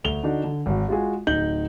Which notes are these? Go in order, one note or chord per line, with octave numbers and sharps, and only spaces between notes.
D2 F7 G7
D3 D4 D#4 F#4
D3
G#1 F#4
G#3 F4 F#4 G#4
D1 D#4 G6 F#7